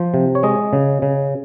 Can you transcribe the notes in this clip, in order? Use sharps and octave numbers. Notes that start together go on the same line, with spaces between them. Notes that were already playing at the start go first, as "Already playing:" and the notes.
Already playing: F3 C5
C3
C#5
G#3 D#5
C#3
C#3